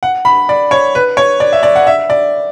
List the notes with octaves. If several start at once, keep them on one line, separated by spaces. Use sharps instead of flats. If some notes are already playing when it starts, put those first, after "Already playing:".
F#5
B5
D5
C#5
B4
C#5
D5
E5
D5
F#5
E5
D5